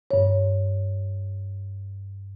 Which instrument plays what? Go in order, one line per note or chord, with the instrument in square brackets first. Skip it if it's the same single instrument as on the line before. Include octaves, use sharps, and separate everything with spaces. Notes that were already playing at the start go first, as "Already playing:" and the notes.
[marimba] G2 C#5